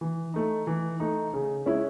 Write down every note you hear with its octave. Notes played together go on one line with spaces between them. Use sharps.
E3
A3 D#4
E3
A3 D#4
C#3
G#3 C#4 E4